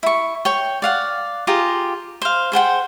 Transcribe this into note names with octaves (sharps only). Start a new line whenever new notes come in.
E4 C#6
C#5 G5
D5 F5 F#5
F4 G4 G#4 A#5
C5 F5
G#4 C5 F#5 G5